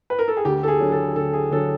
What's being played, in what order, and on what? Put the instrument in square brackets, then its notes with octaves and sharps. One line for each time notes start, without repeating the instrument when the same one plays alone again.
[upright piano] B4
A#4
A4
G#4
D2 G4
A4
G#4
D3 F#3
A4
D2 A4
G#4
D3 F#3 A4